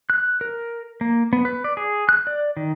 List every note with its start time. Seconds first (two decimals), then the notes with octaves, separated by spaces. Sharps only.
0.10 F#6
0.41 A#4
1.01 A#3
1.33 B3
1.45 B4
1.64 D5
1.77 G#4
2.09 F#6
2.27 D5
2.57 D#3